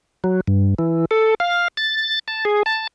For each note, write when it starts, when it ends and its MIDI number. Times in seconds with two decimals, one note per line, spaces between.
0.24 0.41 54
0.48 0.74 43
0.79 1.05 52
1.11 1.35 69
1.40 1.68 77
1.77 2.19 93
2.28 2.45 81
2.45 2.63 68
2.66 2.87 81